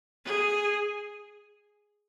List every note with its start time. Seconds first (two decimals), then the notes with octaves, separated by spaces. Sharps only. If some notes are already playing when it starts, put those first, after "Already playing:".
0.25 G#4